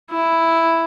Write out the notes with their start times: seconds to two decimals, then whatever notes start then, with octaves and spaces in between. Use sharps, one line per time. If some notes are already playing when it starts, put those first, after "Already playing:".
0.11 E4